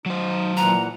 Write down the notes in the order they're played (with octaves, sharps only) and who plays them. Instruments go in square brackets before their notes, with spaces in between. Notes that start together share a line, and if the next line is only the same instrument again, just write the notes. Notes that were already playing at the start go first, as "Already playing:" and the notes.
[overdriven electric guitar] F#3 C5 [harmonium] D#4
[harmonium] A#2 E3 F#5 [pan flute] A#5